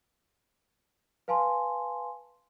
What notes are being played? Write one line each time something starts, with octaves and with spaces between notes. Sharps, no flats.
B4 F5 G#5 A5 C6